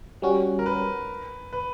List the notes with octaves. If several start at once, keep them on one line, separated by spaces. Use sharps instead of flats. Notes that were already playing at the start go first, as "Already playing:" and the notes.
G3 C#4 F#4
A#4
B4
B4